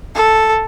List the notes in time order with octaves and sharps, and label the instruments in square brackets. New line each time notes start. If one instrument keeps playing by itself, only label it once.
[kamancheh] A4